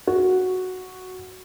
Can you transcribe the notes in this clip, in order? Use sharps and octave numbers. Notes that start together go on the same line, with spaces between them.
F#4